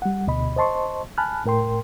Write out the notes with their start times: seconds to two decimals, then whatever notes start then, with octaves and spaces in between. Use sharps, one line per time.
0.02 G3 F#5
0.27 D2 B2 D#5 B5
0.56 C5 D#5 A5 C6 C#6
1.18 G#5 A5 B5 F6 F#6
1.46 A2 A#4 G5 C6